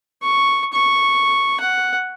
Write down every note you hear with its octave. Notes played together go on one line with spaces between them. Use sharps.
C#6
C#6
F#5